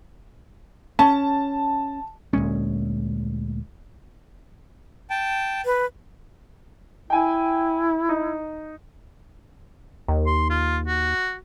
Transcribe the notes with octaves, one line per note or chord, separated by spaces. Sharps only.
C#4 A5
D2 A#2 G#3 C#4
G5 A5
B4
E4 G5 G#5
D#4
D#2
C6
F4
F#4